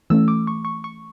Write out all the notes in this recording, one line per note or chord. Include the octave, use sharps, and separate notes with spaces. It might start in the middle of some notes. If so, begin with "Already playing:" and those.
E3 A3 C#4 E6
D6
C#6
C#6
C#6